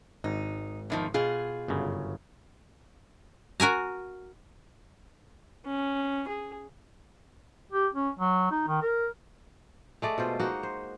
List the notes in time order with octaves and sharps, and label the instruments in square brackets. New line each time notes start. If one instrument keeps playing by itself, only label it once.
[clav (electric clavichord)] G#1 [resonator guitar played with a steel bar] D#4
[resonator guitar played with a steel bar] E2 D#3 F3
B2 F4 G#4
[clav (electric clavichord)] G1 F#2 C#3
[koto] F#4 A#4 G#5 A#5
[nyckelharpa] C#4
G#4
[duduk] G4
C#4
F#3
D#4
D#3
A#4
[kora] G#3 A3 D5 D#5
B2 F4 C5
G#3 A#3 D#4 F#4
C5